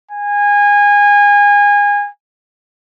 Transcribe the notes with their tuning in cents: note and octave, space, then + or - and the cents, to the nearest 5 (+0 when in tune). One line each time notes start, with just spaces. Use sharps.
G#5 -25